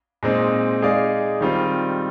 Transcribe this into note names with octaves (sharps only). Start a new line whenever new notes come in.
A#2 G#3 C4 D#4
G#3 D#4 G#4 D5 F5
D#3 G3 C4 F4